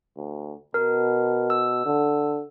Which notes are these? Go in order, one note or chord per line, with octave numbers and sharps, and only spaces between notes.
D2
B2 A#4
E6
D3